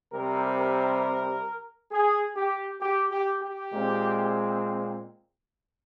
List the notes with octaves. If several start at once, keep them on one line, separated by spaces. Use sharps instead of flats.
C3 G3 C4 A#4
A#4
G#4
G4
G4
G4
G4
A#2 G#3 C4